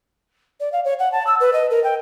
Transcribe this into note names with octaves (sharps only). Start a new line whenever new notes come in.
D5
F5
C#5
F#5
A5
E6
B4
D#5
A#4
G5